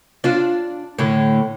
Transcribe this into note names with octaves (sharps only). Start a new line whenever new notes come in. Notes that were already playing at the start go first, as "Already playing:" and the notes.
D4 F4
A2 D3